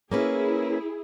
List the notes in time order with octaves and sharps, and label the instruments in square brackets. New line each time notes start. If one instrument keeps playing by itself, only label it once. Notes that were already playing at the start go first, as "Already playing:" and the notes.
[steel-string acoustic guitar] A#3 C#4 B4 [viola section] E4 G#4